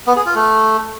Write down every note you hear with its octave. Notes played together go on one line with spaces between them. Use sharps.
B3
G#4
F4
A3